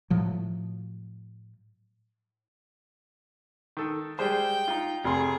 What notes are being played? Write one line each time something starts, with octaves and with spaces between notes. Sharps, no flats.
A2 F3 F#3
D#3 A4
G3 G#3 C5 G5
D#4 F4
F1 G#4 C6